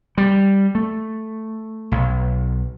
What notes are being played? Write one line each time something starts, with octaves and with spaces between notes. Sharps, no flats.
G3
A3
B1